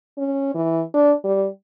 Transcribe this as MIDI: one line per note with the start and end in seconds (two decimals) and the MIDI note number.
0.18 0.53 61
0.55 0.82 52
0.94 1.13 62
1.24 1.47 55